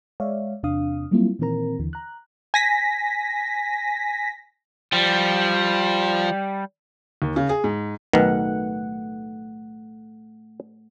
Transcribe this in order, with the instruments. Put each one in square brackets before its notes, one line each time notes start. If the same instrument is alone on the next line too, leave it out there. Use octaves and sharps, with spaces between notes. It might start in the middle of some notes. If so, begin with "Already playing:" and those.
[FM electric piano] G#3 C#5 D5 E5 F5
E2 C3 D4 F5 D#6
F#3 G3 A#3 C4 E4 F4
A#2 D#3 E3 C4 A#4 A#5
D#2 D3 E3
A#5 F#6
[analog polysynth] G#5 A#6 B6
[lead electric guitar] F3 [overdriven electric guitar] G3
[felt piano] D#2
C#3
G#4
G#2
[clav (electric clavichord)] B1 D#3 [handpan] A3 F#5 [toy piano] B4